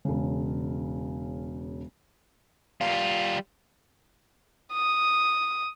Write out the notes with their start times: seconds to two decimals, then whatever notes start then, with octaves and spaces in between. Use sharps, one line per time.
0.05 E1 C#3
2.81 G3 F4
4.74 D#6